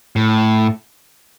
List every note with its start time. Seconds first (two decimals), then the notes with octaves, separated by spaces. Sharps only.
0.16 A2